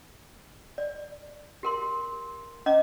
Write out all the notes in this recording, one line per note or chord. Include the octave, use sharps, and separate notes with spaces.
D5
G4 A#4 C6
C#4 D#5 A#5 D6